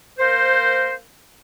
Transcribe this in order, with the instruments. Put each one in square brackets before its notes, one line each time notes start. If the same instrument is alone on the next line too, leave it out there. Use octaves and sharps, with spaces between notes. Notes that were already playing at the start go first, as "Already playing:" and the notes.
[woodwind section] A#3 A#4 C5